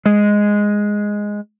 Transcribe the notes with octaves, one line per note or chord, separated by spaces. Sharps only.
G#3